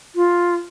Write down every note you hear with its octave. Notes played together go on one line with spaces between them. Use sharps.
F4